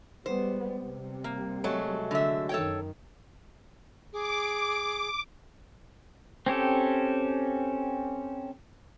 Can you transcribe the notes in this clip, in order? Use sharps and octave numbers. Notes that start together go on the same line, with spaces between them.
G3 G#3 B3 C5
C3 G3
A#3
F#3 G#3 A3
D3 E5
F#2 D#3 A4 C#5 G5
G#4 D6
C4 C#4 G4 A4